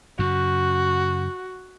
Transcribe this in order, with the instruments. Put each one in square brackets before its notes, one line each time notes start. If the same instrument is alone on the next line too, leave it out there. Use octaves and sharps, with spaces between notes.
[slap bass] F#2 C#3 [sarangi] F#4